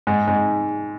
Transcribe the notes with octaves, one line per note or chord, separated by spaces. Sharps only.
G#2
G#2